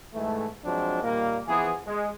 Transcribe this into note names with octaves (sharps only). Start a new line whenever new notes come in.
G#2 E3 A3
F3 F#3 G#3 C4 D4
A#2 D#3 G3 A#3
E3 F3 B3 G#4
G#3